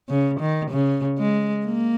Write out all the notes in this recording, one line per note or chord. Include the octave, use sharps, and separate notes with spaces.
C#3
D#3
C#3
G#3
A#3